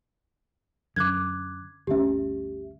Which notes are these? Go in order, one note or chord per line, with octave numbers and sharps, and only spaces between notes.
F#2 D3 D6 F#6 G#6
G1 D2 C#4 G4 E5